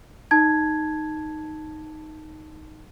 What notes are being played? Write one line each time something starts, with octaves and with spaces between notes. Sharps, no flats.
D#4 A5 G#6